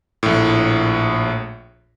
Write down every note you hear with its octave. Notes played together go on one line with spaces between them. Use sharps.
A#1 A2